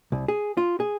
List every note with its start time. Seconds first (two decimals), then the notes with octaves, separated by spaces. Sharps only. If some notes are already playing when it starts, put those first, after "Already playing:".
0.12 C2
0.28 G#4
0.57 F4
0.80 G#4